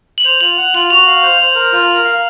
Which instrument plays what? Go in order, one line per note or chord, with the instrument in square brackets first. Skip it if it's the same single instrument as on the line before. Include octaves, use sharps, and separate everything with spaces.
[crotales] F#7
[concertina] C5 [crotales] F7
[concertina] F4 [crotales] F#7
[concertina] F#5
[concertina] F4 [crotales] F#7
[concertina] F#4 [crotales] F7
[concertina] F5
C5
C5
A#4
F4
A#4
F5